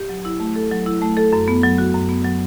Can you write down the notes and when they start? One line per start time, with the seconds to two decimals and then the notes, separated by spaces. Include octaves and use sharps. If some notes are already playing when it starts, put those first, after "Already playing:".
Already playing: G4
0.09 F#3
0.25 E4
0.40 A3
0.56 A4
0.71 F#3
0.86 E4
1.02 A3
1.17 A4
1.33 F#2
1.48 B3
1.64 F#3
1.78 F#4
1.94 F#2
2.09 B3
2.25 F#3